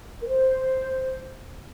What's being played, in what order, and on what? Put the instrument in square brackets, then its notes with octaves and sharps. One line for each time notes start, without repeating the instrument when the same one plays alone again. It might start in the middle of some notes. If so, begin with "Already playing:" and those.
[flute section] A#4
C5